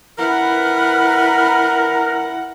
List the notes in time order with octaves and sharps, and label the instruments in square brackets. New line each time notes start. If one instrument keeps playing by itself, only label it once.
[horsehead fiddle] E4 F#5 [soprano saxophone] A#4 [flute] B4 [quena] F6